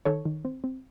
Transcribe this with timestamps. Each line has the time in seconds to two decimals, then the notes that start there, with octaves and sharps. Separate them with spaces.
0.05 D#3 A4 C#5
0.25 D#3
0.45 C4
0.64 C4